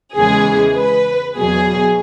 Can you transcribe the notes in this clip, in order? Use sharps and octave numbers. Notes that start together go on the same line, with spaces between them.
E2 C#3 E3 G#3 G#4
B4
E2 B2 F#3 G#4